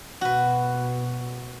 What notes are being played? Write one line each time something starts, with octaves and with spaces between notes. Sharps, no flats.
B2 F#4 B4